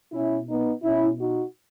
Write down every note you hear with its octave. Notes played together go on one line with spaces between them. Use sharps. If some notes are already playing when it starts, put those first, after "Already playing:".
B2 C#4 E4
B3 D#4
B2 C#4 E4
D#4 F#4